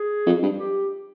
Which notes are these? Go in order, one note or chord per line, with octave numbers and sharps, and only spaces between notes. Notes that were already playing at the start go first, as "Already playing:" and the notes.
Already playing: G#4
F2
G2
G4